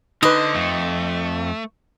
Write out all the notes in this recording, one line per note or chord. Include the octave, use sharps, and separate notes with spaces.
D3 D#4 B4 C5 D#5
F2 A3